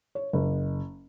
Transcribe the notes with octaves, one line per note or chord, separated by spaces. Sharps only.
C#5
F#1